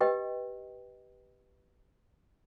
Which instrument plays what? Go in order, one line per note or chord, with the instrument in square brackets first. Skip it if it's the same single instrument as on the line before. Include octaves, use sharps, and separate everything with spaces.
[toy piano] G4 B4 D#5 G5